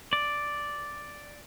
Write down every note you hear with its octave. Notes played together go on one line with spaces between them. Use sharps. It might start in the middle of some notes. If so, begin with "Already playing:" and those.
D5